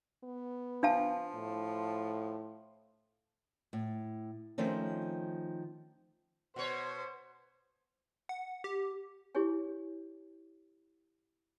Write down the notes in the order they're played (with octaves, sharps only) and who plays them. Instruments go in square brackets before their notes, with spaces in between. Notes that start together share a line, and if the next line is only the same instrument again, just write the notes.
[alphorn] B3
[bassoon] F3 [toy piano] D4 F5 A5
[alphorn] A2
[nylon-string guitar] A2
D#3 F3 A3 C4 C#4
[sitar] B2 C#5 [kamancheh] C5
[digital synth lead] F#5
G4
[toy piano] E4 G4 G#4 C#5 G#5